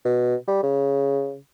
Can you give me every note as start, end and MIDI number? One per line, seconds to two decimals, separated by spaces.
0.05 0.35 47
0.47 0.62 55
0.63 1.37 49